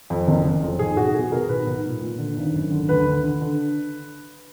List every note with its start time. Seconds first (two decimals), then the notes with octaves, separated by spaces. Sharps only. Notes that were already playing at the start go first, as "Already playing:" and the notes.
0.10 F2
0.28 F#1
0.44 F#1
0.62 F2
0.79 B1 G#4
0.97 B1 F#4
1.14 B2 G#4
1.32 B2 A#4
1.49 B1 B4
1.67 B1
1.84 A#2
2.01 A#2
2.19 D3
2.37 G#1
2.54 F#2
2.71 D3
2.88 D2 B4
3.06 D3
3.24 D3
3.41 D3